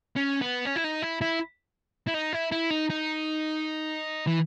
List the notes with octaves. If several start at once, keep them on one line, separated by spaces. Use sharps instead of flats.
C#4
B3
C#4
E4
D#4
E4
E4
E4
D#4
E4
E4
D#4
D#4
E3